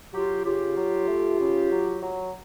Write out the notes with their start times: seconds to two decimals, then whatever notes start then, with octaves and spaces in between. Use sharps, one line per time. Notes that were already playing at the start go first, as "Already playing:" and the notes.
0.13 F#3 F4 G4
0.45 C#3 F4 G4
0.77 F#3
1.08 A3
1.39 C#3
1.71 F#3
2.02 F#3